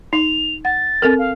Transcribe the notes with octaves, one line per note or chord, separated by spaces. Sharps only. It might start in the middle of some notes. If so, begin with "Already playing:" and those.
D#4 F7
F#5 A6
C4 A4 A#4
F5